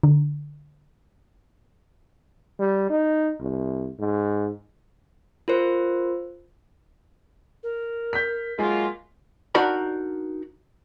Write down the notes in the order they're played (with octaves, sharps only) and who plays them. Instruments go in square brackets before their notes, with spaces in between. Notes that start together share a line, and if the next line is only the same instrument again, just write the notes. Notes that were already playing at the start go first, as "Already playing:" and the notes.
[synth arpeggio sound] D3
[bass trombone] G3
D#4
C2
G#2
[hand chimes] F4 A#4 C5
[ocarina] A#4
[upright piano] G6 B6
[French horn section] F#3 A#3 F4 [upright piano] G#3
[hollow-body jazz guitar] D4 D#4 F#4 A#4 D5 B5